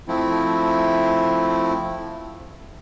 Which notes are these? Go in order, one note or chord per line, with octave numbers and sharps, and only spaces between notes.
F3 A3 C4 E4